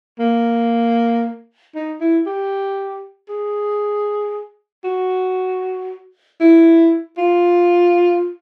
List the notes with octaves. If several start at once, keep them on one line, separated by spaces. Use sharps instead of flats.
A#3
D#4
E4
G4
G#4
F#4
E4
F4